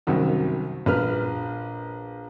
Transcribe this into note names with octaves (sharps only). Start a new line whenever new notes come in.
C2 F#2 D#3 F#4
A#1 B4 F6